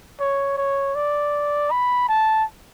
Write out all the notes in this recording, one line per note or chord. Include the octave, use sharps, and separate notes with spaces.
C#5
C#5
D5
B5
A5